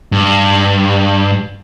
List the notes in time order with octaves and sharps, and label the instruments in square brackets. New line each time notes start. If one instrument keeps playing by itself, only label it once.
[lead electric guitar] G2